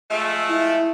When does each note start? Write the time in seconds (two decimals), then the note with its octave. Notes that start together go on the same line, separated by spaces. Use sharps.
0.10 F3 G#3 A3
0.49 E4